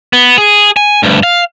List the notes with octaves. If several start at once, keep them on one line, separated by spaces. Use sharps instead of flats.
B3
G#4
G#5
D2 G2
F5